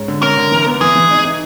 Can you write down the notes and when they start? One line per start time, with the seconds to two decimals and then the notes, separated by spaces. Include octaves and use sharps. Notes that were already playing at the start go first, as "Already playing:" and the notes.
Already playing: G#2 C#4
0.08 D3
0.23 C#4 A#4
0.37 D3
0.52 E3
0.66 B3
0.81 E3 G#4
0.95 E3
1.11 D#4
1.25 D#4